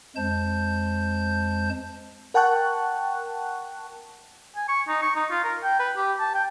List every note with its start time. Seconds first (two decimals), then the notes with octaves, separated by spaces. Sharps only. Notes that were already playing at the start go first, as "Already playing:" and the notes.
0.16 F2 G#3 C5 A5 G6
2.34 A#4 F#5 G5 A5 C#6 F#6
4.56 G#5
4.69 C#6
4.88 D#4
5.03 C#6
5.16 D#4
5.31 F4
5.44 A#4
5.63 G5
5.80 B4
5.97 G4
6.19 A5
6.34 G5